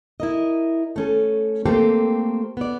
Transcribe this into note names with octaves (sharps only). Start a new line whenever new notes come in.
E4 A#4 D#5
A3 C#4 A4
A3 A#3 C4 G4 A4
B3 D5